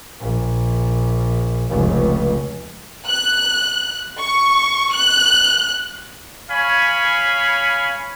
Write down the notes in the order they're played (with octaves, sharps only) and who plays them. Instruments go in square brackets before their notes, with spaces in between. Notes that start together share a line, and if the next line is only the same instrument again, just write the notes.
[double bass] A#1
F1 C#2
[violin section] F#6
C#6
F#6
[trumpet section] C#5 F5 G#5 B5